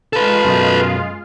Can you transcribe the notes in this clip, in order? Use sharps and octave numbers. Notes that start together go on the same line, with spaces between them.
G#3 F4 A4 B4 F5
F#2 B2